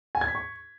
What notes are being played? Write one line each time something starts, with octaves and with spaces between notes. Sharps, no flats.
G#5
G#6
B6
C#6